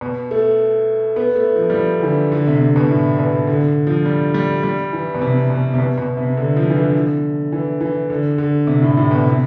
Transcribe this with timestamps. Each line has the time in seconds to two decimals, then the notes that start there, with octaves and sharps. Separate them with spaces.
0.01 B2
0.31 A3
1.16 B3
1.36 A3
1.56 F3
1.70 G3
1.74 F3
1.99 D3
2.03 E3
2.32 D3
2.47 C3
2.61 C3
2.76 B2
2.91 A2
3.19 B2
3.47 D3
3.87 F3
4.06 G3
4.34 G3
4.63 G3
4.93 E3
5.15 B2
5.21 C3
5.50 B2
5.74 C3
5.79 B2
5.98 B2
6.17 C3
6.37 D3
6.56 F3
6.70 E3
6.75 D3
7.52 E3
7.81 E3
8.10 D3
8.38 D3
8.67 C3
8.82 A2
8.97 A2
9.11 B2
9.26 C3